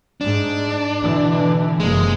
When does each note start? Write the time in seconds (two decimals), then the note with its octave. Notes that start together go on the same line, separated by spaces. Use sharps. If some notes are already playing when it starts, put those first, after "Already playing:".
0.21 G#2 D4
1.02 B2 D3 E3
1.80 F#1 C3 G#3 A#3